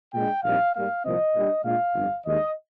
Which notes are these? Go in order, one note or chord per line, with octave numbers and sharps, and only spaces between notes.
A#2 G#3 D4 G5
A#1 A#2 G3 C4 D#4 F5
G#2 G3 A#3 F5
C2 A#2 F3 C4 D#5
A#2 G3 D4
A#2 G#3 D4 F4 F5
G1 F2 D3 G3
D#2 D#3 G#3 D#4 D#5